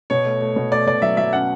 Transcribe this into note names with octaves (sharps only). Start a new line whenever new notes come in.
B2 C#5
A3
A3
B2
A3 D5
B2 D5
F#3 E5
F#3 E5
C#4 F#5